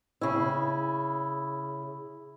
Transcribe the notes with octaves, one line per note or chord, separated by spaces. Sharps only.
C#3 E4